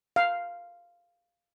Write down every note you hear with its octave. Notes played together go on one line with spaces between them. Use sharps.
F5